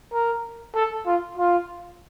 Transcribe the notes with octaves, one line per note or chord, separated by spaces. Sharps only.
A#4
A4
F4
F4